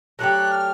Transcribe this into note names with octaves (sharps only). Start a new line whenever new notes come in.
F#3 A3 D4 G4 F#6
F6